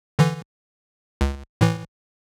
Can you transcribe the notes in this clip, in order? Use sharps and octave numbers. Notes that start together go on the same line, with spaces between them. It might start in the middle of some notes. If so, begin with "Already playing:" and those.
D3 E3
C#2
A2 E3